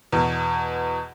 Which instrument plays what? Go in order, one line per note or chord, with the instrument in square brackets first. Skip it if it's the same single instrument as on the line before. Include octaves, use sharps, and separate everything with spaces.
[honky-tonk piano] E2 B2